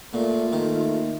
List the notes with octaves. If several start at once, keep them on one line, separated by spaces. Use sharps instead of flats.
A#2 A3 A#3 F4
D#3 A3